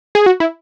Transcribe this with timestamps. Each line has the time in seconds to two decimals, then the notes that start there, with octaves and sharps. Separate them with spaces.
0.15 G#4
0.26 F#4
0.40 E4